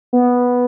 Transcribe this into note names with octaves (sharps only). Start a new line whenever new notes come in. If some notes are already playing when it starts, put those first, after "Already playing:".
B3